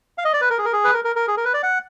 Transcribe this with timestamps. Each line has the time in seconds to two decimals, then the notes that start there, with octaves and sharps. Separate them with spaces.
0.18 F5
0.25 D#5
0.33 D5
0.41 B4
0.50 A#4
0.58 G#4
0.65 A#4
0.73 G#4
0.84 B4
0.94 A#4
1.05 A#4
1.16 A#4
1.28 G#4
1.37 A#4
1.45 B4
1.54 D5
1.63 F#5